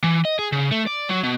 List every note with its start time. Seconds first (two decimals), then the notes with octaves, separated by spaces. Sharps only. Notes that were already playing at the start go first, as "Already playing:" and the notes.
0.04 E3
0.25 D#5
0.39 G#4
0.52 C#3
0.72 A3
0.87 D5
1.10 F#3
1.24 B2